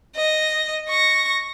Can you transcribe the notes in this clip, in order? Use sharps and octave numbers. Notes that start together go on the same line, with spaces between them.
D#5
C#6 A#6